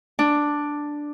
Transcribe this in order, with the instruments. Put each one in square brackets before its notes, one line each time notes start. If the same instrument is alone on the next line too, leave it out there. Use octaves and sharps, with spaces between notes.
[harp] D4